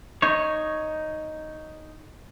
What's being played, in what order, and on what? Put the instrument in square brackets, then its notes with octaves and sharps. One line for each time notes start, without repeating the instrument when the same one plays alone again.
[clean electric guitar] D#4 C#5